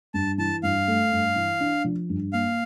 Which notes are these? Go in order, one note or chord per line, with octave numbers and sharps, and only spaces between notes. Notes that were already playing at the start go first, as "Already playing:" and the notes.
G2 A5
E3 A5
G2 F5
A3
G2
E3
D4
F3
G2
A#3 F5